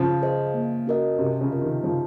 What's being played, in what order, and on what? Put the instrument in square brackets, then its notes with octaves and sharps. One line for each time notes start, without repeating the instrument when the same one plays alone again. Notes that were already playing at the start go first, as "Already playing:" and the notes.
Already playing: [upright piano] C#3 F3
[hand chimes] G#4 C5 D#5
A#3
C#4 F#4 A#4 D#5
[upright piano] C3 [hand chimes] C#4
[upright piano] C#3
[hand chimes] F4 A#4 D#5
[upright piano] C3 D#3
[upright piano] C#3 F3 [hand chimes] C#4